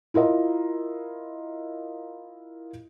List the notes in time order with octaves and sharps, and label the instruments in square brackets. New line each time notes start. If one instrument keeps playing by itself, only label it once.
[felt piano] E4 F4 A#4 D#5